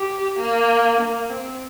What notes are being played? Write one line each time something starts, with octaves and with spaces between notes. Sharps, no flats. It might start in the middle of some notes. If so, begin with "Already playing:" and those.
Already playing: G4
A#3
A#3
C4